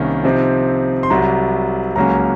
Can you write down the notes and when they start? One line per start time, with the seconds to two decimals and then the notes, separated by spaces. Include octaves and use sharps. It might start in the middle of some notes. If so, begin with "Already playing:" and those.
Already playing: C2 C3 D#3 A#3 C#4
0.24 C3 F3 C4 D#4
1.03 C6
1.10 C2 C3 F#3 A#5
1.96 C#2 C#3 F#3 A#3 C#4 A#5